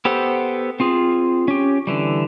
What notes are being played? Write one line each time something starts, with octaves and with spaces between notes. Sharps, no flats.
B3 G4 A4 C5 F#5
C4 F4 G#4
C#4 G4
D3 E3 G3